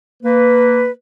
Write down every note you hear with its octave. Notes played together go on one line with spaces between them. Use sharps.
A#3 B4